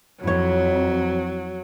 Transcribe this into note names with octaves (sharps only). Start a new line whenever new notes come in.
F2 F#3 E4 C#5